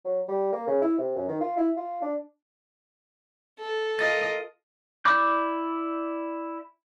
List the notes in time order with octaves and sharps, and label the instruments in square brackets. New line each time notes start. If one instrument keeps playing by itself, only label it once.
[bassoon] F#3
G3
A#3
C#3
E4
C3
F#2
D#3
F4
E4
F4
D4
[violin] A4
[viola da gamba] F4 A#4 D#5 [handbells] A6
[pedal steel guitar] E4 D5 B5 D6 G6